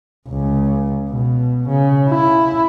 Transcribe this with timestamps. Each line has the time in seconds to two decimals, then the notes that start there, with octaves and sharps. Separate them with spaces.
0.29 C#2
1.10 B2
1.69 C#3
2.10 E4